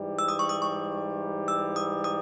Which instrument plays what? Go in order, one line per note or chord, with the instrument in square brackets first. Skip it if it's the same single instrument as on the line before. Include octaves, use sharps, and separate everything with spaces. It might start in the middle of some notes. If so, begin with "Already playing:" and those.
Already playing: [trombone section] G#2 E3 G3
[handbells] E6
D#6
C#6
D#6
C#6
E6
D#6
D#6